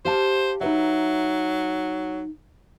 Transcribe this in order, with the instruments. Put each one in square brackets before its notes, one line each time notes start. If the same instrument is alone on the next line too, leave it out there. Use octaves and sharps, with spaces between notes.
[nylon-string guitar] G4 F5 A5 [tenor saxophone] C5
[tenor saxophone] F#3 [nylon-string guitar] D#4 B4 E5